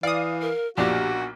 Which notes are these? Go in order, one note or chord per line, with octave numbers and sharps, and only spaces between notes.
E3 D5 F5 D#6
A#4
B1 A#2 F3 D4 F#4 G4